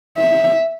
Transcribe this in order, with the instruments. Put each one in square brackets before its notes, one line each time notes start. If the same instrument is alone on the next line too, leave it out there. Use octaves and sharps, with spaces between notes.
[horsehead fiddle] E5